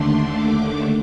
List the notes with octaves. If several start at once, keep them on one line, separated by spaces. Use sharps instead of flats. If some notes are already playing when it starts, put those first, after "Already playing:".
Already playing: D#2 D3 A3 D4 C6
D6